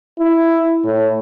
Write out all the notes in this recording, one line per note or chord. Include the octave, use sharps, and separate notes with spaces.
E4
A2